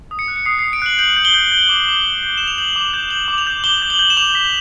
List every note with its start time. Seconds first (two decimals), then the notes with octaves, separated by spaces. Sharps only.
0.11 D#6
0.19 C#7
0.28 F#6
0.36 C#7
0.45 D#6 C7
0.59 C7
0.64 D#6
0.73 D7
0.82 F#6 F#7
0.98 G6 F#7
1.16 G6
1.25 G7
1.34 G6
1.52 G6
1.69 D6
1.88 D6
2.06 D6
2.23 G6
2.37 G6 E7
2.47 F7
2.58 G6 F#7
2.76 D6
2.94 G6
3.10 G6 F#7
3.28 D6
3.38 F7
3.47 G6
3.64 D6 G7
3.82 G6
3.90 F#7
3.99 G6
4.10 E7
4.17 D6 F7
4.34 D6 B6